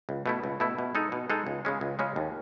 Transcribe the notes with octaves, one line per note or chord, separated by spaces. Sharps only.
C#2
B2 A3 E4
C#2
B2 A3 E4
B2
G#3 D#4 A4
B2
G#3 D#4 A4
C#2
C#3 G#3 C#4
C#2
C#3 G#3 C#4
D#2